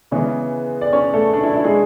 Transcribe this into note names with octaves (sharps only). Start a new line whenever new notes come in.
C#3 E3 G#3 B3 C#4 C#5
D5
C#4 C#5
A3 A4
D4
E4
E4
G#3 G#4